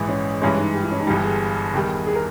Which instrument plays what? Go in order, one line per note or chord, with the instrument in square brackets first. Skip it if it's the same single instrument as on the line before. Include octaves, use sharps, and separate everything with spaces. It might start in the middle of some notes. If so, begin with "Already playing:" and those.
Already playing: [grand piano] A#1 G#2 E3
[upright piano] C#4
[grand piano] G2 E3 G#3 [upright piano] C#4
[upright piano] D#4
G4
E4
C#4
D#4
[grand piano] G1 G2 E3 G3 [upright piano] G4
[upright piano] G#4
[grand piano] E2 D#3 G3
[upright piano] G#4
A#4